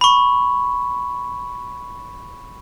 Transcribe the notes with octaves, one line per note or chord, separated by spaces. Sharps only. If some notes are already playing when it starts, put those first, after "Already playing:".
B5 C#6